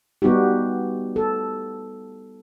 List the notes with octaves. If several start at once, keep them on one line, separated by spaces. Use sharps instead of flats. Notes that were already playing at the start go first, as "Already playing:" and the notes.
G3 B3 D#4 F#4 G4
A4